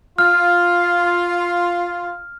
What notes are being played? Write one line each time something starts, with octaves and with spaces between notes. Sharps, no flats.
F4 F6